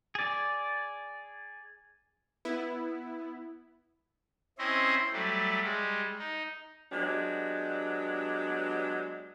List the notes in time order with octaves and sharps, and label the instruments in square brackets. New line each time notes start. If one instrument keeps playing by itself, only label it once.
[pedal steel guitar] G#4 D5
[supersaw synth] B3 E4
[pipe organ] C4 C#4 E4 C5 D#5
F#3 G3 A3
G3 G#3
D#4
[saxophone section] F#3 G#3 B3 D4 G4